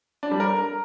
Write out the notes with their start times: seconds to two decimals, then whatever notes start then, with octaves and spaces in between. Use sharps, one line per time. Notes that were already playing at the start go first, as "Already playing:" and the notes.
0.23 D4
0.31 G3
0.40 A#4